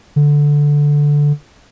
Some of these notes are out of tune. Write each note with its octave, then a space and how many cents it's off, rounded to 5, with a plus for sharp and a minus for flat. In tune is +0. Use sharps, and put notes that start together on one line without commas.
D3 -5